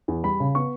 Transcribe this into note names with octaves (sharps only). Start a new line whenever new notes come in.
E2
G3 B5
C#3
B3 C#6